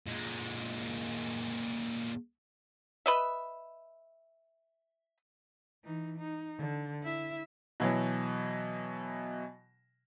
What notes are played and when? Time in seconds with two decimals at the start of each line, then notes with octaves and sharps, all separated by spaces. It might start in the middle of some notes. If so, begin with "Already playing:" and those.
0.07 A#2 G#3
3.06 B4 D#5 E5
5.84 E3 D#4
6.18 D#4
6.58 D3
7.03 E4 E5
7.80 B2 E3 F#3